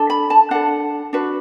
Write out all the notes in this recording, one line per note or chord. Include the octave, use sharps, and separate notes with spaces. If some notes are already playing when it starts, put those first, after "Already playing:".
Already playing: D4 A4
B5
A5
D4 A4 F#5
D4 F#4 B4